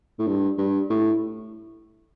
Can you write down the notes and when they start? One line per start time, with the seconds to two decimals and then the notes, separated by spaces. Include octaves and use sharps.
0.19 A2
0.27 G2
0.58 G2
0.90 A2